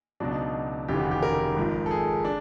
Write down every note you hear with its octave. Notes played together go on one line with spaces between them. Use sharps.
C#2 B2 F#3 D4
D#4
F1 D#2 C#3 E3 G4
F#4
G4
A#4
G#1 G#2 F3
A4
G#4
D4